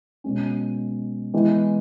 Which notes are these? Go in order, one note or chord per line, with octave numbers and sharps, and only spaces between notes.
B2 G#3 C#4
E3 G#3 B3 E4